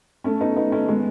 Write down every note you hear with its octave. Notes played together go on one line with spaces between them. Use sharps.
A3 C#4
B3 D#4
B3 D#4
A3 C#4
G#3 B3